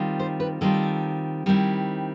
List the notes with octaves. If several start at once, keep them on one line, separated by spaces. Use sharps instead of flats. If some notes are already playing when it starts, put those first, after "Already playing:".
Already playing: D#3 G3 C4 F4
C5
B4
D#3 G3 C4 F4 A4
D#3 G3 C4 E4